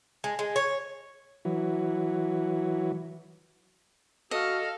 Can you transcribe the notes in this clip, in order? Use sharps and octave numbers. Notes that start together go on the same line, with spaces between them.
G#3
G#3
C#5
E3 F#3
F#4 A4 D#5 F5